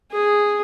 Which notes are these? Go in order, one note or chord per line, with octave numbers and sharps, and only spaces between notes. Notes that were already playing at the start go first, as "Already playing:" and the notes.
G#4